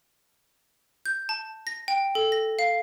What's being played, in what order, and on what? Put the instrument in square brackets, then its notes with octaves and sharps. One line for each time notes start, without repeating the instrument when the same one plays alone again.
[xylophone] G6
A5
A#6
G5
A4
A#6
F5